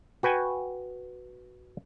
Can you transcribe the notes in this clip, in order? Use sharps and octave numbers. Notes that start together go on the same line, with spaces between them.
F#4 B4 G5 G#5